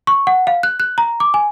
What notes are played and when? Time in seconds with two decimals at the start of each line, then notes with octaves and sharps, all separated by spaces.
0.07 C#6
0.27 F#5
0.47 F5
0.63 F#6
0.80 F#6
0.98 A#5
1.20 D6
1.34 G#5